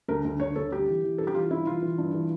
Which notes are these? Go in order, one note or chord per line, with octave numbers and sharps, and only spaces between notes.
D2 A#4
D2
D2 C#5
D2 A4
G2 G4
E3
E3
G2 A4
G4
E3 F4
G2 E4
E3 F4
E3
G2
E3